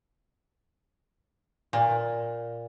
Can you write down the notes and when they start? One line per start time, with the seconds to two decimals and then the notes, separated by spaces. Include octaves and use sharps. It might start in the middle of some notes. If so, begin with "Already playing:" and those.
1.73 A#2